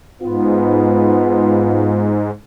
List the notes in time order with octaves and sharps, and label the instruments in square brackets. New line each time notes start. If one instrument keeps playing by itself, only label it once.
[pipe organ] G#2 [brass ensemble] B3 F4